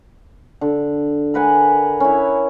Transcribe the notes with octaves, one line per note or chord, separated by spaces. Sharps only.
D3
A#4 B4 F#5 G#5
C#4 E4